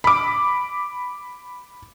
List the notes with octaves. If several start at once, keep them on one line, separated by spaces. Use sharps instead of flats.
B5 D6